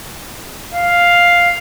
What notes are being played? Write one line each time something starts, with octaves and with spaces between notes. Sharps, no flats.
F5